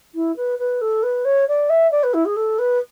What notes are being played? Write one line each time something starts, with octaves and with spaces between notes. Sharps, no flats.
E4
B4
B4
A4
B4
C#5
D5
E5
D5
B4
E4
G#4
A4
B4